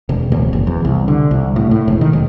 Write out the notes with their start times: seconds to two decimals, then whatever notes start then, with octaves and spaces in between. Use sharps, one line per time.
0.09 E1
0.32 D1
0.53 F#1
0.67 E2
0.85 C2
1.08 D3
1.31 C2
1.56 A2
1.71 A2
1.88 E1
2.01 D#3
2.13 E1